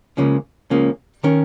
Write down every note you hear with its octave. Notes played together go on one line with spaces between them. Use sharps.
C#2 C#3 F3 A#3 C#4
C#2 C#3 F3 A#3 C#4
D#3 C#4 A#4